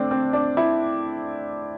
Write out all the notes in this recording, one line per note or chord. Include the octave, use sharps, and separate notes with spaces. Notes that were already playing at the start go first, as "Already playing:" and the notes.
Already playing: A3 C4 D4
C4
D4
E4